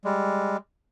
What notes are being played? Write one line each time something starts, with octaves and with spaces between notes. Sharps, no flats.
G3 G#3